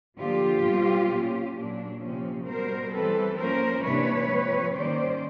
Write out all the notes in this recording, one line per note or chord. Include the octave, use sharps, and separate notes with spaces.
D3 F3 A#3 F4 G4
B2 G3 C4
A#2 F#3 A#3 C#4
A#2 F#3 A#3 D4
C3 F3 A#3 C#4
B2 G3 B3 A#4 C5
E3 G3 C4 A4 B4
F3 A#3 C#4 A#4 C5
C3 E3 G3 A#3 D4 B4 C#5
F3 G#3 C4
D#3 G3 A#3 C#4 C5 D5